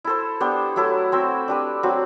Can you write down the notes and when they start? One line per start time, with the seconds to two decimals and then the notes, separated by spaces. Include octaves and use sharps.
0.04 E4 A4 C5
0.40 B3 D4 G4 C5
0.76 F#3 A3 E4 A4
1.12 C4 F#4 C5 E5
1.48 D4 G4 B4
1.83 F#3 C4 F#4